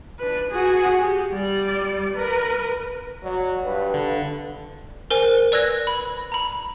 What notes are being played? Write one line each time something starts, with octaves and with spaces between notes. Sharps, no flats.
D4 B4
F#4 G#4
G4
G3 D5
A#4 B4
F#3 D5
G2 B4
D3
A#4 C5 G#5
B4 D5 E6 F#6 G#6 A#6
B5
A#5 B5